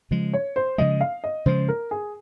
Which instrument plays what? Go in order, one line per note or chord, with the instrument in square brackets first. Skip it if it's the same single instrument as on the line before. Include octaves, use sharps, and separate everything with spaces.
[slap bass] C#3 F3 G#3
[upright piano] C#5
C5
[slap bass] C#3 F3 G#3 [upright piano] D#5
[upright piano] F5
D#5
[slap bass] C#3 F3 G#3 [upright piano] C5
[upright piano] A#4
G#4